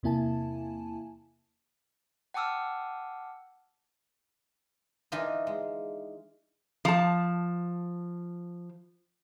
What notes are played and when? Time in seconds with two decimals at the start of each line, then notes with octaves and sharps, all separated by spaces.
0.03 E2 C3 A#3 E4 G#5 A5
2.34 F#5 G5 A5 D6 E6 F6
5.12 E3 D4 D#4 F4 D#5
5.47 G#3
6.85 F3 A5